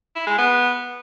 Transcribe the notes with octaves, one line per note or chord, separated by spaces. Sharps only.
E4
G#3
B3